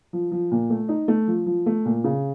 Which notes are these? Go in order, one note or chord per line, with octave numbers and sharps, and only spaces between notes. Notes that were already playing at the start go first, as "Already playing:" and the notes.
F3
F3
A#2
A3
D#4
A3
F3
F3
A3
A#2
C#3